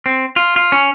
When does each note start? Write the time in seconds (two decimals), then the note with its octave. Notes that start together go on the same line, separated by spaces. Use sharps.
0.06 C4
0.36 F4
0.56 F4
0.72 C#4